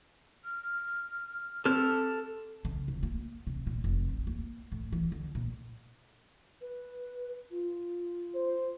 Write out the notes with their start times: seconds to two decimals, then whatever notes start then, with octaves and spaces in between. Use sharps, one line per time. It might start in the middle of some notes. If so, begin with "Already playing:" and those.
0.45 F6
1.65 C4 G4 A4 F6
2.65 C#3
2.88 F1
3.03 A#3
3.47 C3
3.67 A#2
3.84 F1
4.09 A1
4.27 A#3
4.72 A2
4.92 E3
5.12 D3
5.35 A#2
6.61 B4
7.51 F4
8.35 C5